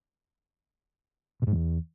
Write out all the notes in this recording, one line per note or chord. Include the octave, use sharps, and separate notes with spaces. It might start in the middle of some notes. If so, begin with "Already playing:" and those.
B2
G#2
E2